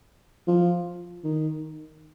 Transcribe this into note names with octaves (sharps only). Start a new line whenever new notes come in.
F3
D#3